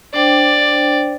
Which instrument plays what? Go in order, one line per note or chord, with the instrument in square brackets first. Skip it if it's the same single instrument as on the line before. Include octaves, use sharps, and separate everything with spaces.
[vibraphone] D4 C5 G5 [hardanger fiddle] D5